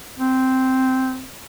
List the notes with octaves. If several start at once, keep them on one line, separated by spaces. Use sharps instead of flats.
C4